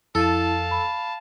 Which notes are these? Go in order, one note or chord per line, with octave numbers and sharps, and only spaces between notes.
F2 E4 A4 F5 A5
B5